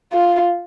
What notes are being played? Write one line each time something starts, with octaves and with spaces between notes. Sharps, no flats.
F4